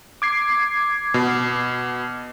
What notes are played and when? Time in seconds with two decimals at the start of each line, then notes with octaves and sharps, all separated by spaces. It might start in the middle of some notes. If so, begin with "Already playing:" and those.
0.22 D6 G#6 C7
1.14 B2